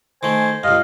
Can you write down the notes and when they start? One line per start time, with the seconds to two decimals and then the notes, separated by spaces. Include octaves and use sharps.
0.23 D#3 A3 C5 G#5
0.64 C#2 G2 D#5 F5